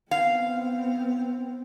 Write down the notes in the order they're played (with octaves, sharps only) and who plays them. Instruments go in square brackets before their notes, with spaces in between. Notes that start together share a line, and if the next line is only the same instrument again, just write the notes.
[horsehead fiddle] B3 C4 [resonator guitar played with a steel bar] F5